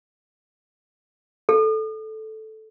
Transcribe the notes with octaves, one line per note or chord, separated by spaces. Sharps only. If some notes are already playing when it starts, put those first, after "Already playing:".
A4